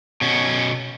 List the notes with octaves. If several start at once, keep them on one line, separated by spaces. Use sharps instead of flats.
B2 C#4